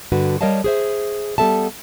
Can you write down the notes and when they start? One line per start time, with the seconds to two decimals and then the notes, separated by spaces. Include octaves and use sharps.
0.12 G2 D3 F#4 B4
0.41 G3 A#4 C#5 D#5 F5 A5
0.64 G#4 C5 E5
1.38 G3 B3 A4 E5 A5